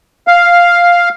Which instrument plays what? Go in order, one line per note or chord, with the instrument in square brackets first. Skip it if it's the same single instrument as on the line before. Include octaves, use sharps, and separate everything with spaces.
[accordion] F5